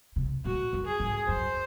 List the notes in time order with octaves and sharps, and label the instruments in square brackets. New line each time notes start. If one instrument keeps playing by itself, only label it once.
[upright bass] C3
[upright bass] A#2 [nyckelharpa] F#4
[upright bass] F#2
[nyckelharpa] G#4
[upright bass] G#2
[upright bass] F#2 [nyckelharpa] C5